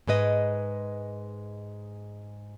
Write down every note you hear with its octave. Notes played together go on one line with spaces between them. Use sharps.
G#2 G#3 B4 D#5